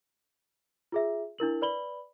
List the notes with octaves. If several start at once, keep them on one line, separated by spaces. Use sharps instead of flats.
F4 G#4 E5
D4 E4 A#4 F#7
B4 D5 B5 F#7 G7